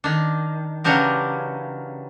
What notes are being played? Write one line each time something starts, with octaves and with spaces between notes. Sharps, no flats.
D#3 D4
C#3 E3 F#3 D4 G4 A#4